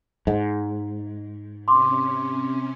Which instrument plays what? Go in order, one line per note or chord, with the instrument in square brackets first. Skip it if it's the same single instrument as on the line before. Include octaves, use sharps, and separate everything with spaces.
[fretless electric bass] G#2
[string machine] C3 C#4 [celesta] C6 D6